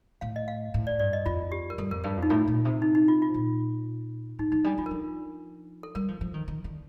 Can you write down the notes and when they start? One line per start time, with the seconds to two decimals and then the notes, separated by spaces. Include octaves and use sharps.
0.21 A2 F5
0.36 D#5
0.48 F5
0.74 A2
0.87 D5
0.99 G2 D5
1.13 D#5
1.26 F2 F4
1.52 G4
1.70 A#4
1.78 G2 A4
1.91 F2 A#4
2.04 G2 A#4
2.17 F2
2.23 D#4
2.30 A2 F4
2.48 A#2
2.65 C3
2.82 D#4
2.95 D#4
3.08 F4
3.22 F4
3.34 A#2
4.39 A2 D#4
4.52 F3 D#4
4.64 G3 D4
4.78 F3 F4
4.86 A#4
4.91 F3 A4
5.83 A4
5.95 G3 A#4
6.08 F3
6.21 F3
6.34 D#3
6.48 D#3
6.64 D3